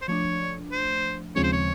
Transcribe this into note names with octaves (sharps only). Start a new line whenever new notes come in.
C5
F3 A3 D4 C#5
C5
D#2 C#3 F3 G#3 C4 C#5
C5
C#5